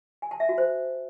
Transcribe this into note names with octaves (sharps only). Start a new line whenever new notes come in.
G#5
A5
E5
F#4
C5